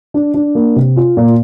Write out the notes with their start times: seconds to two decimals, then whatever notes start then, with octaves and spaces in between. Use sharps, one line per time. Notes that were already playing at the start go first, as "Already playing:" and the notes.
0.14 D4
0.34 D4
0.55 A#3
0.76 C3
0.96 F4
1.17 A#2